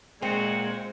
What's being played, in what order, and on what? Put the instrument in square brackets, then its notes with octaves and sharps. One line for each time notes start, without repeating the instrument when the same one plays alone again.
[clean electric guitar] A#2 F#4 [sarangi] G#3 [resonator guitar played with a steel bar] C4